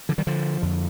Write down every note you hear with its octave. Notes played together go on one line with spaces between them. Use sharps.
D3 F3
D#3 G3
D3 F3
F2 D3